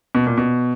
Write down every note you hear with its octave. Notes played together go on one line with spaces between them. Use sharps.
B2
A#2
B2